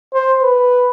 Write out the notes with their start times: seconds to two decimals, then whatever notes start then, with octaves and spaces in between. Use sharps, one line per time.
0.13 C5
0.42 B4